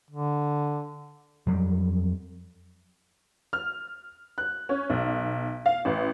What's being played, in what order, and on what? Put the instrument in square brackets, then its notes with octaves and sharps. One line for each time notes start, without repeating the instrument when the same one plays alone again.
[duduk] D3
[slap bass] F2 F#3 G3
[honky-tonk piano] F6
F#6
C#4
B1
F5
A1